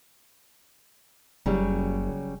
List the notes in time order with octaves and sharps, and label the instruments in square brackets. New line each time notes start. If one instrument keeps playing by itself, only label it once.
[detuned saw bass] F#1 [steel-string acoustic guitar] C#3 F#3 G3